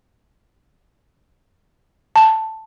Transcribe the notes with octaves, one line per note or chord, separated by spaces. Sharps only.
A5